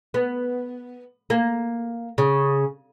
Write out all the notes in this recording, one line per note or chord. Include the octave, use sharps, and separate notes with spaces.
B3
A#3
C#3